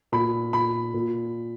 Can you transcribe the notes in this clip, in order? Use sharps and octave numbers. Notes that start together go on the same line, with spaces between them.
A#2 B5
A#2 B5
A#2